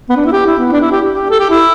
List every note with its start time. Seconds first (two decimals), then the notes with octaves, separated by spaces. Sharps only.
0.09 B3
0.17 D4
0.25 E4
0.32 G4
0.47 E4
0.59 B3
0.72 D4
0.81 E4
0.91 G4
1.11 G4
1.30 A4
1.40 G4
1.50 E4